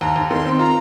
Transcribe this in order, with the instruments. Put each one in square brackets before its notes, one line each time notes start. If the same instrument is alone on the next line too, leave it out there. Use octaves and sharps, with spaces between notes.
[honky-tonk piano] D#2 [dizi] A#5
[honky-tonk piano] D#2
[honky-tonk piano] D#3 [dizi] C6
[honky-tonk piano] C4
[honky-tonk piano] F4 [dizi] A#5